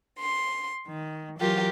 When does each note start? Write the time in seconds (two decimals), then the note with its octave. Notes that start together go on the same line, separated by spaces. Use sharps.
0.19 C6
0.86 D#3
1.39 E3 F#3 F4 G4 A#4